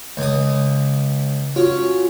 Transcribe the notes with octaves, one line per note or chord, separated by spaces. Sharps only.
C#2 D#6
C#4 F4 F#4